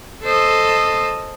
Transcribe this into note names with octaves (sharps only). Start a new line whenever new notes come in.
A4 C5 D#5